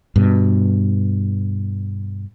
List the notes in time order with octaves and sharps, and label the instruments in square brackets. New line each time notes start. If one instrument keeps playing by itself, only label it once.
[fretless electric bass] G2 B2